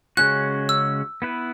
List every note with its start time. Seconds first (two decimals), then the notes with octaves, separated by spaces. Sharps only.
0.17 C#3 G#3 C#4 F#4 F#6
0.69 E6
1.22 B3 E4 B4